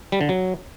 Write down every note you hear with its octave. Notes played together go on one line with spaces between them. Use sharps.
G3
D3
F#3